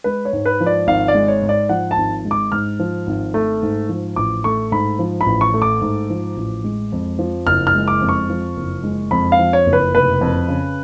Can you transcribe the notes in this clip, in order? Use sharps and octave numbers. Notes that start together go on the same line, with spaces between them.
G#3 B4
C#5
G#2
B4
F3
D5
G#1 F5
D5
G#3
C#5
G#2
D5
F3 F#5
A5
G#1
G#3
D6
G#2 F6
F3
G#1
A3
G#2
F3
A1 D6
A3 C#6
G#2 B5
F3
B5
A1
C#6
A3
D6
G#2
F3
A1
G#3
F2
F3
F#1 F6
F6
G#3
D6
F2
C#6
F3
F#1
G#3
F2 B5
F5
F3
C#5
F#1
B4
F1 B4
F2
C#3